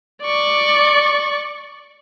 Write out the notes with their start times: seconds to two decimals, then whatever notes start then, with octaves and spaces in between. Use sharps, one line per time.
0.23 D5 C#6